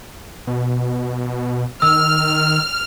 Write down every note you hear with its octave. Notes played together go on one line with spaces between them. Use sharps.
B2
D#3 E6 F6